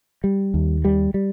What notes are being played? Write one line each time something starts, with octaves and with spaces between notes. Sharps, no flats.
G3
D#2
G3
G3